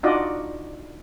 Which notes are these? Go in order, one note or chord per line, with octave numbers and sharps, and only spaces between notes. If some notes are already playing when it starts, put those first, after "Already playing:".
D4 D#4 F4 F#4 D5 D#5